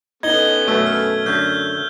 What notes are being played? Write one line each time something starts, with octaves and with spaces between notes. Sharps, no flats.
B3 C#4 D#4 A4 G#6 G7
F#2 B2 A3
F6
F#2 D3 G6